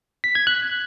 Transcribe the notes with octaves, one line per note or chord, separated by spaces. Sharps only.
B6
G#6
F#6